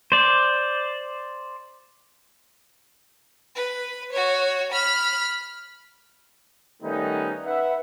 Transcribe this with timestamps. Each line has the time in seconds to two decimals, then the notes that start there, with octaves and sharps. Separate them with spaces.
0.12 C5 D5
3.56 B4
4.12 F#4 C#5
4.72 B5 F6
6.83 D#3 G3 A3 B3 C#4 D#4
7.45 B4 E5 F#5